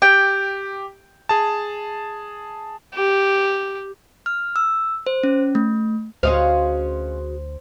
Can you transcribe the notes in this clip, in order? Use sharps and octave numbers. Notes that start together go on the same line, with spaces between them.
G4 G5
G#4 A5
G4
F6
E6
C5
C#4
A3
D2 C#4 F#4 G#4 B4 C5 D#5 F5